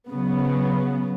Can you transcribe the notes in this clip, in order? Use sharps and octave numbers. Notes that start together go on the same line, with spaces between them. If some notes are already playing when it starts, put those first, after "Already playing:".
C#3 F#3 B3